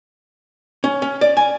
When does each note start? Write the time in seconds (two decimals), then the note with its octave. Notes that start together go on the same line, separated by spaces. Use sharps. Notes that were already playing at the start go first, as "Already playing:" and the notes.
0.84 C#4
1.02 C#4
1.21 D5
1.37 G#5